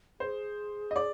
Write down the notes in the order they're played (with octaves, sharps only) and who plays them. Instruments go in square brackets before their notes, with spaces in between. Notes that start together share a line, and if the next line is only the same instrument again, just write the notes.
[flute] G#4 [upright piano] C5
[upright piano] D#5
D5